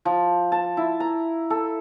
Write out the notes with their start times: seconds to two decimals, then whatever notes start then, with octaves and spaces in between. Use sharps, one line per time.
0.05 F3
0.52 A5
0.77 E4
1.00 A#5
1.50 A4